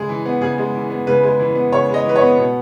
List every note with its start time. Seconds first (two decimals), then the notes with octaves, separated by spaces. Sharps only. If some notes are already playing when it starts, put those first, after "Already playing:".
Already playing: C#3 G#3 G#4
0.09 E3
0.25 B3
0.41 C#3 G#4
0.58 G#3
0.75 E3
0.90 B3
1.07 C#3 B4
1.23 G#3
1.39 E3
1.55 B3
1.72 C#3 C#5
1.89 G#3
1.94 D#5
2.05 E3 B4
2.16 C#5
2.21 B3
2.38 B2